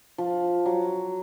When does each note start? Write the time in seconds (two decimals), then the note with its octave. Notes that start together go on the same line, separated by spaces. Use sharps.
0.18 F3
0.66 F#3